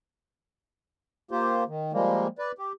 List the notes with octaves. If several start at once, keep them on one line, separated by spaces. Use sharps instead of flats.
A#3 F4 G4 C5
D#3
F3 G3 G#3 A#3
B4 D5
G4